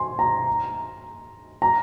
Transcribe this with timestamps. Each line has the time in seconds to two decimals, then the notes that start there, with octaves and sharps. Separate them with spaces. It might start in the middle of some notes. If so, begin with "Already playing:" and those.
Already playing: G#5 C6
0.19 A#5
1.62 A#5